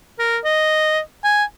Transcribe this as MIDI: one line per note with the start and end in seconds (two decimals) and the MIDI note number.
0.19 0.38 70
0.44 0.99 75
1.24 1.44 80